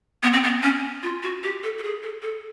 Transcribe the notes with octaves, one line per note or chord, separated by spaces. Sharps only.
B3
C4
B3
C#4
F4
F#4
G4
A4
A4
G#4
A4
A4